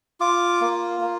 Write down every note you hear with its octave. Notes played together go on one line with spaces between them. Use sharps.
F4 D6
A#3
A#3